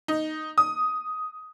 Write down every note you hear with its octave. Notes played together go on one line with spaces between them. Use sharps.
D#4
D#6